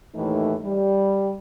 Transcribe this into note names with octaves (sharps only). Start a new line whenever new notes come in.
D#2 A2 E3 A3 D#4
G3